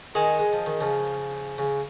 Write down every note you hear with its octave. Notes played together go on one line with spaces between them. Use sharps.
D#3 G#3 G#4 D#5 G#5
G#3
F3
D#3
C#3 F3
C#3